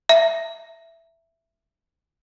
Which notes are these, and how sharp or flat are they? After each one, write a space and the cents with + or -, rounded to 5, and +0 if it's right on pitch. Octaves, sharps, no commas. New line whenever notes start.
E5 +10 A#5 -35